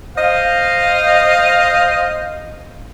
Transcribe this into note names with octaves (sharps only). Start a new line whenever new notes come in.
C5 D#5 F5